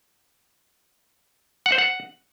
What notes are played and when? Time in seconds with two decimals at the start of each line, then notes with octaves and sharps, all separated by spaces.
1.66 F#5
1.72 C5
1.78 F#5